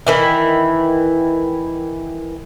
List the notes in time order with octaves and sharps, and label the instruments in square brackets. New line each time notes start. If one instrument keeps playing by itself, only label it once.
[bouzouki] D#3 E3 E4